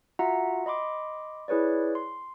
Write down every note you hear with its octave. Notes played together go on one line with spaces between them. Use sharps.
F4 F#4 E5 F#5 A#5
D#5 B5 C6 D6
E4 G#4 B4 C#5 D5
C6